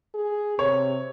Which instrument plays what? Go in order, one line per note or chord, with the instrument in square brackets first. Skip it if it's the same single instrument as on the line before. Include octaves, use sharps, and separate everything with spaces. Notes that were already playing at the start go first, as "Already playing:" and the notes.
[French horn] G#4
[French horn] C3 [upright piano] C#5